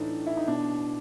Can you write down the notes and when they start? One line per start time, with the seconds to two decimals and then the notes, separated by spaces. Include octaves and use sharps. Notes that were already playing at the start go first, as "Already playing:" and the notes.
Already playing: A2 E3 D4 D#4
0.27 E4
0.37 D#4
0.47 B2 D4